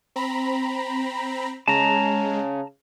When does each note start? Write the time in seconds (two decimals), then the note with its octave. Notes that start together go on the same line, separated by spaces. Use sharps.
0.16 C4 A#5 B5
1.68 C#3 G#3 A5 A#5